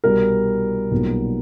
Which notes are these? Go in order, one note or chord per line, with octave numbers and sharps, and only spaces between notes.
C2 B2 G3 A#4
B1 A#2 G3 B3